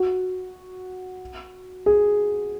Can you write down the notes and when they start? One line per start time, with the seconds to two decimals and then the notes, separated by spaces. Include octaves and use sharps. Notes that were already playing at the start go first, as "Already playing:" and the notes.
Already playing: F#4
1.86 G#4